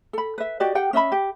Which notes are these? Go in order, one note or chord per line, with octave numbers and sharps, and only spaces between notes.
A4 B5
B4 E5
F#4 G4 D5 D#5
G4 F#5 G5
C#4 D#5 E5 B5
G4